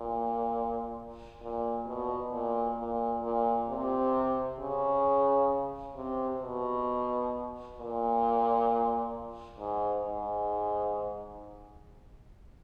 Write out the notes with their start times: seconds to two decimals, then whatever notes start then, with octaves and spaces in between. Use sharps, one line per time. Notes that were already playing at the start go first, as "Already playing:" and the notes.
Already playing: A#2
1.42 A#2
1.87 B2
2.33 A#2
2.78 A#2
3.23 A#2
3.69 C3
4.59 C#3
5.95 C3
6.41 B2
7.78 A#2
9.59 G#2
10.04 G#2